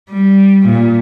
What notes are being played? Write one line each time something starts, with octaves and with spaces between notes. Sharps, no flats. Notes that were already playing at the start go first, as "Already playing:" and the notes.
G3
A#2